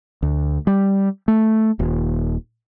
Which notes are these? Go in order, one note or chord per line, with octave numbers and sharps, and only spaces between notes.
D2
G3
A3
D#1